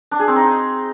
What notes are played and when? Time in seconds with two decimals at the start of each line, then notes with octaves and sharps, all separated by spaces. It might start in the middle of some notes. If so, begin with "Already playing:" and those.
0.11 D4
0.20 G#4
0.28 C4
0.36 D#4